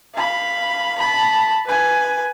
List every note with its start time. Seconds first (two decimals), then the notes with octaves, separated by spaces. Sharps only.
0.15 F5 B5
0.99 A5 B5
1.66 B4 G#5